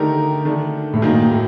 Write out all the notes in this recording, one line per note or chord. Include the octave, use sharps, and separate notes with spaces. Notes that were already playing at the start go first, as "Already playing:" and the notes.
Already playing: D3 D#3 A3 D#4 G4 A#4
D#3 A3 D4
A2
A#2 D#3 F#3 A#3 D#4
A2